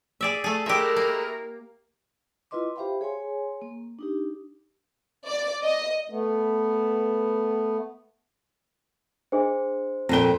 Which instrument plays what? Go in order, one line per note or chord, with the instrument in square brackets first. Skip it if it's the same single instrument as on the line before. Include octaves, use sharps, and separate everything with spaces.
[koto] G#4 D5 E5
[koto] A3 G#4 [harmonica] A4
[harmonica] G#3 A3 E6 [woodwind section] E4 A#4 [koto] G4 E5
[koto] A#3
[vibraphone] E4 F4 B4 D#5 C6 D6
G4 C5 E5 F5 G5 B5
G#4 C#5 G#5 C6
A#3
D4 D#4 G4
[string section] D5
D#5
[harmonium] A3 B3
[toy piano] D4 G#4 D#5 [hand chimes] C5
[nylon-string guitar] F2 A#2 G5 [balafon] C4 A4